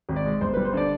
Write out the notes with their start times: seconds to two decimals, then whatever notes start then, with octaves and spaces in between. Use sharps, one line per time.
0.09 G#1
0.16 D5
0.25 G#3
0.41 G1 C5
0.54 G3 B4
0.65 C5
0.73 D3 D5